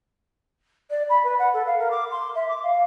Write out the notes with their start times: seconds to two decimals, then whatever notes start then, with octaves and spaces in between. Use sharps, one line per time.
0.90 D5
1.09 B5
1.23 B4
1.39 F#5
1.53 A4
1.66 F5
1.79 A#4
1.90 D6
2.11 C6
2.35 E5
2.48 D6
2.63 F5